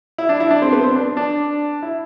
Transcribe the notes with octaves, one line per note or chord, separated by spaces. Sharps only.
E4
D4
E4
D4
C4
B3
C4
D4
D4
E4